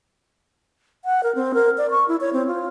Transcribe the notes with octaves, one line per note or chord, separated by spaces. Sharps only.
F#5
A#4
C4
A#4
D5
C#6
E4
C#5
C4
F4